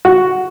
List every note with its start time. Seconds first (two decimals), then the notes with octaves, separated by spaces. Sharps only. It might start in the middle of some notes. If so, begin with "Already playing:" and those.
0.05 F#4